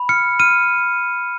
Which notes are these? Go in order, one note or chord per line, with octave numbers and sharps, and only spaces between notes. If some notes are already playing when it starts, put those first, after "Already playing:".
Already playing: B5
F6 C#7
F6 D#7